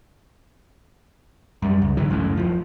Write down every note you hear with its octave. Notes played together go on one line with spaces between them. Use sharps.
F#2 G3
C#2
G#2 D3 E3 F#3
F#1 C#2 F#2 A2
D#1 F3